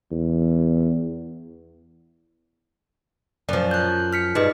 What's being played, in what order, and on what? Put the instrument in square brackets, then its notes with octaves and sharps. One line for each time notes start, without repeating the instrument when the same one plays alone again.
[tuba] E2
[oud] F#2 F3 [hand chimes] D5
[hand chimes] F#6 G6
F6 B6 C#7
[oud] G2 [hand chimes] D#4 G#4 D#5